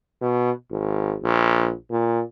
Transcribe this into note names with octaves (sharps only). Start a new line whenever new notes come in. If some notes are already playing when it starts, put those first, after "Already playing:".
B2
G#1
A#1
A#2